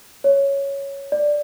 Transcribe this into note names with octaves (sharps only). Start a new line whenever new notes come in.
C#5
D5